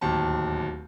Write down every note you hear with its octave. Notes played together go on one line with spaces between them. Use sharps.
D1 D#2 A5